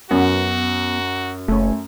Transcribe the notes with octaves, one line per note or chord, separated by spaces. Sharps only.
F#2 B3 F#4
F#1 A3 C#4